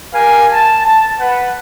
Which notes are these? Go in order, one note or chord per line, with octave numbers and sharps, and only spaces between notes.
G4 A#4 F5 G#5
A5
A5
B4 F#5